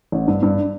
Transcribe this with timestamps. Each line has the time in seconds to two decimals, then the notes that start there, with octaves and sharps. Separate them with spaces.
0.12 A1
0.28 G2
0.42 G2